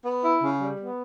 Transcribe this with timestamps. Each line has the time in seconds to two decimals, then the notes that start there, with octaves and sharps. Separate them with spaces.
0.05 B3
0.23 E4
0.42 C#3
0.61 G3
0.80 B3